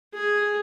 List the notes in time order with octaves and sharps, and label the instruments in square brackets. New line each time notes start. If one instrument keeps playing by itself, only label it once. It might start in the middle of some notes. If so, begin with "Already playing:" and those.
[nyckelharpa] G#4